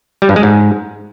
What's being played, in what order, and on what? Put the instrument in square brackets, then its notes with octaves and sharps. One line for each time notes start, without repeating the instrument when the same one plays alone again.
[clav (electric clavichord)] G3
G2
G#3
G#2